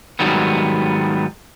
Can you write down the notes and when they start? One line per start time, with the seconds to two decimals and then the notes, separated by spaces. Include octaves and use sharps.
0.19 G#2 D#3 F#3 G3 B3